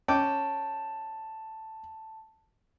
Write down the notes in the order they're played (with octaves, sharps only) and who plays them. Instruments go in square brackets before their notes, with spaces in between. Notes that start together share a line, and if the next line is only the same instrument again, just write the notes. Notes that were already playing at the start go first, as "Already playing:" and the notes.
[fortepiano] C#4 G5 D6 [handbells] A5